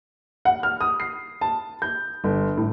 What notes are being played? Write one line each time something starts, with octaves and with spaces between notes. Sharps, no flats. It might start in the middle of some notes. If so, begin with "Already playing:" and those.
F#5
F6
D#6
C7
A5
G6
G1
A2